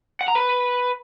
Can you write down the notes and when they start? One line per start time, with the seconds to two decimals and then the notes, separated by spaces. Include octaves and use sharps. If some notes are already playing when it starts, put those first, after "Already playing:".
0.21 F#5
0.28 A#5
0.35 B4